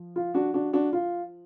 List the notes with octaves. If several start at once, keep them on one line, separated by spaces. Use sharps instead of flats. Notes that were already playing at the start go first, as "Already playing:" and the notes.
Already playing: F3
F4
D4 F#4
D4 F#4
D4 F#4
F4